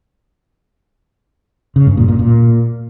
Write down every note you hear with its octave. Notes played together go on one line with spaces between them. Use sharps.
C#3
G2
A#2
A#2
A#2